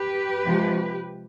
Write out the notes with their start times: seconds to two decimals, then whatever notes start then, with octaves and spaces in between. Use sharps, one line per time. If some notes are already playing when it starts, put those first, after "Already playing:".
Already playing: G4 B4
0.45 C3 F3 G#3